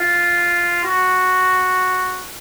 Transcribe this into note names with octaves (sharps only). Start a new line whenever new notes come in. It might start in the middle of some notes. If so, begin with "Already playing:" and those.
Already playing: F4
F#4